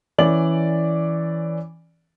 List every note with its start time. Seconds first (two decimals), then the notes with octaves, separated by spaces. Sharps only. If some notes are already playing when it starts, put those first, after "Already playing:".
0.18 E3 C#4 D5 D6 F#7